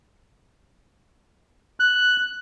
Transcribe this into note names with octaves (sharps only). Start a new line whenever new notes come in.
F#6